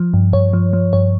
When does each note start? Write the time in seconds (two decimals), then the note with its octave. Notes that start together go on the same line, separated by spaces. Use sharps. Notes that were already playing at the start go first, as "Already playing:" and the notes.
Already playing: F3
0.14 G2
0.33 G2 C#5
0.53 F3
0.73 F3
0.93 G2 C#5